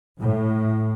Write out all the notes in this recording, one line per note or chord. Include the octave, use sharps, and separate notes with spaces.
A2